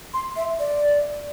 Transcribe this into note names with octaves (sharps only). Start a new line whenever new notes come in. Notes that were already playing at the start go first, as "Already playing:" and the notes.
C6
E5
D5